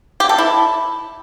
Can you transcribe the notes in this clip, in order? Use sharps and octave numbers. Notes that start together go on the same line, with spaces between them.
G4
A4
E4